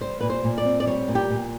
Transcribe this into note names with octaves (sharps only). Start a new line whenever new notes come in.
G3 C5
A#2 B4
C5
A#2
D5
C4
D5
G3 C#5
A#2
G4
A#2